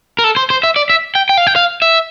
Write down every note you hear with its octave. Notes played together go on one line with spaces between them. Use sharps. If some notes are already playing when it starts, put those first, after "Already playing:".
A#4
A4
C5
C5
E5
D5
E5
G5
G5
F5
G5
F5
E5